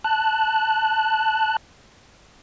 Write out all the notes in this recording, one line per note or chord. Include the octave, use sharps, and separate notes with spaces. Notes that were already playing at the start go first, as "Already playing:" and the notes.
A5 F#6